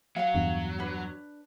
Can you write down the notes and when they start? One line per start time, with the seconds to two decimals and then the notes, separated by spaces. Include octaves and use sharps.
0.16 F#3 F5 F#5
0.35 E2 G2
0.79 D4 B4